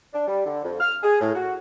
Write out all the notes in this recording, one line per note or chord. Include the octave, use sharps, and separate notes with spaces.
D4
G3
D3
F2
F6
G#4
A2
F#4